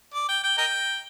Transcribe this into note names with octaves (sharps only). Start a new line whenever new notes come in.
D5
G5
G5
A#4 D#5 G5